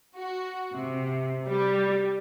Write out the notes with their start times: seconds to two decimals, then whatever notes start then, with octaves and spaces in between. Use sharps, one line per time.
0.16 F#4
0.73 C3
1.47 G3